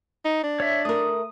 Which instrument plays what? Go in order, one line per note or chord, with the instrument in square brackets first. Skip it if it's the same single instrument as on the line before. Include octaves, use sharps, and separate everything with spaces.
[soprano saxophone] D#4
D4
[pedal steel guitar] C#5 E5
[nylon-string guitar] A3 A#4 [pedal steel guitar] D#6